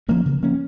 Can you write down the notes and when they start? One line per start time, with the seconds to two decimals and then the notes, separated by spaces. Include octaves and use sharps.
0.08 F3 A#3 C#4
0.26 C#3
0.42 F3 A#3 C#4